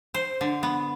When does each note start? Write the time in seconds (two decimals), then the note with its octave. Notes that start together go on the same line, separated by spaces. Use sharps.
0.14 C5
0.41 D3
0.63 B3